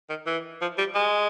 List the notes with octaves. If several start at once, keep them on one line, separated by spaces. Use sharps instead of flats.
D#3
E3
F3
G3
G#3